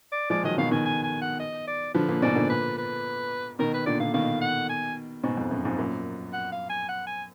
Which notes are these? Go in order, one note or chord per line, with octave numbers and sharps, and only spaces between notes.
D5
F3 G#3 D5
D#3 F#3 D#5
B2 D#3 F5
B2 D#3 G#5
G#5
G#5
F#5
D#5
D5
D3 F3 B4
A#2 D3
G#2 B2 D5
A#2 D3
B4
B4
B2 D#3 A#4
B4
A#2 D3 D5
A#2 D3 F5
B2 D#3 F5
F#5
G#5
G#2 B2
F2
F#2
F2 G#2
F#2 A#2
F#5
F5
G#5
F#5
G#5